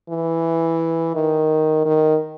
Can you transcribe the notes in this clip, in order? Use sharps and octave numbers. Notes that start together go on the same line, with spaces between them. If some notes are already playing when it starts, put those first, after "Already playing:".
E3
D#3
D#3